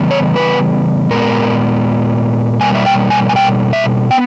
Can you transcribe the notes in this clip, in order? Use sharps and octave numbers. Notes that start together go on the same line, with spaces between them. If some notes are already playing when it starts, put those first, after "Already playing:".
Already playing: C#3 E3 G3 B3
C#5
B4
A#2 G#3 B3 A#4
B2 G3 A#3 G#5
E5
G5
G#5
G#5
G5
E5
B3 G5